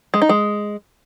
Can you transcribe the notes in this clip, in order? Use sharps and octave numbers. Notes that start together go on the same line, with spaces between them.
G#3
D#4
G#3